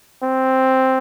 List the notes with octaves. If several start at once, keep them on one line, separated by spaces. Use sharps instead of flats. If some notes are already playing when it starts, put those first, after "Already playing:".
C4